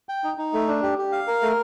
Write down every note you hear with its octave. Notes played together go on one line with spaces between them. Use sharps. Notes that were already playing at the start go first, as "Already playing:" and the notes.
G5
D#4
D#4
A3
D4
G4
G4
F5
A#4
A3